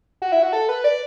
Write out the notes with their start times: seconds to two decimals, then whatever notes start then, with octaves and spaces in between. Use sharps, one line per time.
0.22 F#4
0.32 E4
0.42 F#4
0.53 A4
0.69 B4
0.84 D5